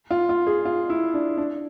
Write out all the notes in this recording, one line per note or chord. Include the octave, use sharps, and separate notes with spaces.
F4
F4
G#4
F4
E4
D4
D4